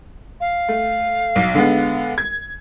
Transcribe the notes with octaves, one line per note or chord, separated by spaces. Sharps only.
F5
A3
B1
D3 G#3 B3
G#6